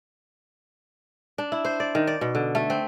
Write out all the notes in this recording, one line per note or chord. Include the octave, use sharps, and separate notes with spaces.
D4
E4
C5
D5
D#3
D5
B2
D3
A3
C4